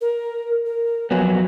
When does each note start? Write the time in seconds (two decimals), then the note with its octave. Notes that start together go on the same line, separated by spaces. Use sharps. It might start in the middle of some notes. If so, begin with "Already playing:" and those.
0.01 A#4
0.66 A#4
1.11 F2 F#3 B3 G#5